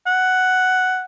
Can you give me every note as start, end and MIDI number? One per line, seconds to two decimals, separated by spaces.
0.07 1.05 78